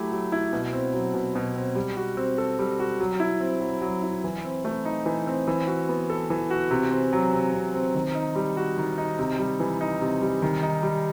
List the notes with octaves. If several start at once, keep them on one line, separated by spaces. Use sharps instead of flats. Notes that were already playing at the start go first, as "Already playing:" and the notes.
Already playing: F#3 A3 E4 G4
F#3
E4
B2
C4
F#3
B2
B2
C4
G3
F#4
C4
A4
G3
F#4
F#3
E4
C4
F#3
F#3
E4
E3
C4
A3
D#4
E3
C4
E3
F#4
B3
A4
E3
F#4
C3
C4
F#3
C3
C3
C4
D#3
D#4
G3
F#4
D#3
D#4
C3
G3
E3
D#4
C3
G3
D#3
D#4
G3